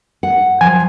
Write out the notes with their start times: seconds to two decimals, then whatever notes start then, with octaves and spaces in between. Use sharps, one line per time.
0.23 F#5
0.61 F3 F#3 G#5